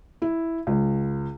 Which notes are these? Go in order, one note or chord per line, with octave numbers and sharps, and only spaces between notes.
E4
C#2